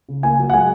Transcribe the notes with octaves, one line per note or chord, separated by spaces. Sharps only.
C#3
A#3 G#5
F#3
F#5
G#3 G#5